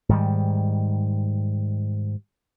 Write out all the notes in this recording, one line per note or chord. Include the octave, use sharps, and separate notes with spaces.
G#2 D#3 G3